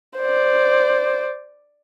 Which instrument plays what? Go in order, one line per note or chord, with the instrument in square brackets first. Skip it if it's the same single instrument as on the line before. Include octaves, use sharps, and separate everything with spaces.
[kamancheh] C5 D5